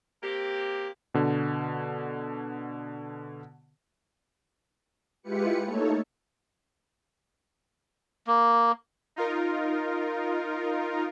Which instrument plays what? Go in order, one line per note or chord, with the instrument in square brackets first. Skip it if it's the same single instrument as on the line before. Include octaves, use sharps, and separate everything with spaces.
[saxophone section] A#3 C4 G4
[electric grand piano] B2 D3
[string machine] G#3 E4 F4 G4 B4 C#7
A3 A#3 D#4 A4 C#5
[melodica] A#3
[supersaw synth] D#4 F4 A#4